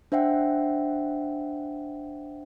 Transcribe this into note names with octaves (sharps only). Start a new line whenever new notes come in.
D4 C5 E5 F#5 G5